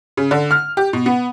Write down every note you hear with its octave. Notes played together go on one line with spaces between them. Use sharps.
C#3
D3
F6
G4
B2
B3